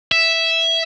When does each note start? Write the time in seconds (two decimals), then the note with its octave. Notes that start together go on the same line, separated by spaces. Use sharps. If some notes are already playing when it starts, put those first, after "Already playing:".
0.12 E5